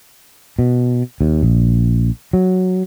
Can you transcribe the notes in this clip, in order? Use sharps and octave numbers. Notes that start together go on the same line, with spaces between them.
B2
D#2
A#1
F#3